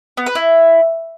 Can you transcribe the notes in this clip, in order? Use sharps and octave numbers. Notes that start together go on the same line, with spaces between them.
B3
B4
E4